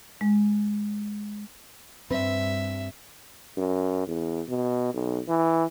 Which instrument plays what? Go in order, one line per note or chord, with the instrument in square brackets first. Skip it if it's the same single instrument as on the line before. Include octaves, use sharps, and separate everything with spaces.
[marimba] G#3
[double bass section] G2 [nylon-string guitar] C4 B4 [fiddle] E5
[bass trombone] F#2
E2
B2
B1
E3